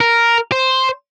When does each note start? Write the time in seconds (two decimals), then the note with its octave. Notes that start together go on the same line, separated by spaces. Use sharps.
0.01 A#4
0.52 C5